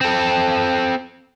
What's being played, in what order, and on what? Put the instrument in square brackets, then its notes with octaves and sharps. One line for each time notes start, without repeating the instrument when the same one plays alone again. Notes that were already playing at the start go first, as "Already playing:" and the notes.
[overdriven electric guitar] C4 A4